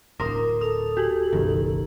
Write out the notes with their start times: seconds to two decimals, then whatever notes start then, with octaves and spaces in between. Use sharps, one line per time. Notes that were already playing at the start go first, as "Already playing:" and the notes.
0.20 D1 G1 A#4 C5 C6 D6 D#6
0.61 A4 D#6 F7
0.97 F#4 G4 F#7
1.33 F#1 B1 D#3